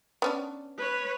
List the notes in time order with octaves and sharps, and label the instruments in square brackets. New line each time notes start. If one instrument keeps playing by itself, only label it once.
[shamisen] B3 C#4 D4
[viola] B4 C#5